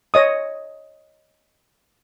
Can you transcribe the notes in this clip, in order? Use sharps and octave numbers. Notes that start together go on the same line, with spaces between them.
C#5 D#5 D#6